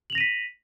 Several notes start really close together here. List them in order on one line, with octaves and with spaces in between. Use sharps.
F#7 F7 A#6 D#7 B6